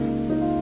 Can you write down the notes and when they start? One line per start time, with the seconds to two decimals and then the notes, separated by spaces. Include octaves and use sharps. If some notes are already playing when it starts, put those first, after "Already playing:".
Already playing: C#2 C#3 A#3 D#4
0.30 D#4
0.41 F4